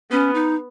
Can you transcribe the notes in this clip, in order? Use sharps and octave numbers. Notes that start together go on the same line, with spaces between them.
B3 C#4
D#4